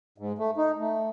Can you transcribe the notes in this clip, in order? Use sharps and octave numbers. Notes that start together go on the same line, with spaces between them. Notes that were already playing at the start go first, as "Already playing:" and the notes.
G#2
A3
D#4
A3